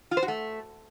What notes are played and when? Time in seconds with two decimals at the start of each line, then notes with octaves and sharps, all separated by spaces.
0.11 F4
0.17 C5
0.23 F#4
0.28 A3